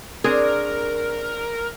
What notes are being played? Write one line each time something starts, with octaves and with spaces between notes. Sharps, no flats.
C4 D4 G#4 A#4 C#5